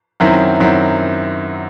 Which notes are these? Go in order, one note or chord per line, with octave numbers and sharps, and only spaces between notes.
F#2 D#3 F#3 C4 E4
F#2 D#3 F#3 C4 E4